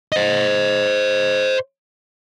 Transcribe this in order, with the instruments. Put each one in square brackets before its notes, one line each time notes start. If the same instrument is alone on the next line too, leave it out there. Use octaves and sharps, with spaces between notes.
[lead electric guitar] C5 D#5